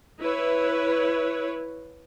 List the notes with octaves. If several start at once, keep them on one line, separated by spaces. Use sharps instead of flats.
E4 B4 C#5